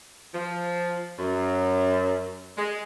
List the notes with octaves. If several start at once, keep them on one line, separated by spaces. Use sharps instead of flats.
F3
F#2
G#3